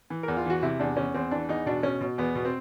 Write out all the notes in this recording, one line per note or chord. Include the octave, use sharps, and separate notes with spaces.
E3
E2 A#4
F4
E3 F#4
C3 E4
E2 D4
E2 C#4
E2 C4
E3 D4
E2 D#4
B2 D4
B2 C#4
B2
E2 B3
B2
C4